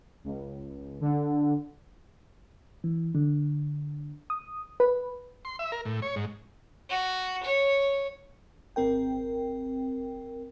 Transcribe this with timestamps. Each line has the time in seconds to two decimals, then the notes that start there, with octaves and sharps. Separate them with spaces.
0.24 C#2
1.00 D3
2.84 E3
3.15 D3
4.30 D#6
4.80 B4
5.45 C6
5.59 E5
5.72 A#4
5.85 A2
6.02 C#5
6.16 G#2
6.89 F#4
7.44 C#5
8.76 G#1 C4 A#4 G5